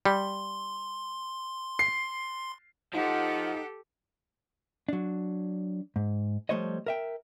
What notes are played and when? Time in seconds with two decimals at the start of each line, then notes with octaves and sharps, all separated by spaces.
0.05 G3 C6
1.79 C7
2.93 F3 D#4 G4 A4 F#5
4.89 F#3 D4
5.96 G#2
6.49 F3 G3 A3 C5 C#5 D#5
6.86 A#4 E5 G5